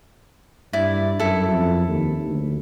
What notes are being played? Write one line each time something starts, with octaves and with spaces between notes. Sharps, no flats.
G2 E4 D5
F#2 E4 A4
F2
D#2
D2